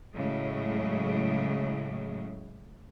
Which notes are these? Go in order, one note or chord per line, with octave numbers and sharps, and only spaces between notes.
A2 C#3 F#3 G#3